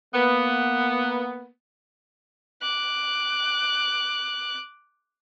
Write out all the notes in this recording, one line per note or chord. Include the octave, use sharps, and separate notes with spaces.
A#3 B3
D6 F#6